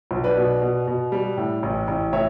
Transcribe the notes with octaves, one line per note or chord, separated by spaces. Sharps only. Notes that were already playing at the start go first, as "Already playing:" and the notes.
B1
B4 D5
B2
B2
B2
G3
A2
A1
A1
A2 C#5 E5